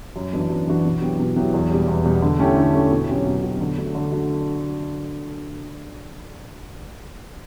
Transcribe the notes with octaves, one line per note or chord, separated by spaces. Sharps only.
F#2
E3 B3 D4 F#4
F#2
E3 B3 D4 F#4
B2
F#3 B3 E4 G4
B2
F#3 B3 E4 G4
E2
B2 G3
E2
B2 G3
D3
A3 C#4 E4 G4
D3
A3 C#4 E4 G4
B2
F#3 C#4 G4
B2
F#3 C#4 G4
D3
A3 D4 F#4
D3
A3 D4 F#4